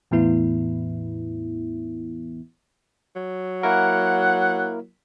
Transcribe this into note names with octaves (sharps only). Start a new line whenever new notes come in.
E2 A2 E3 B3 E4
F#3
A#3 E4 A#4 F#5